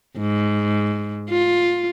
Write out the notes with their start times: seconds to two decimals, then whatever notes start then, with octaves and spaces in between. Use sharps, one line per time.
0.17 G#2
1.30 F4